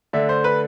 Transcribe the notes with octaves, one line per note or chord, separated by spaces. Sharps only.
D3 A3 D4 E5
C5
B4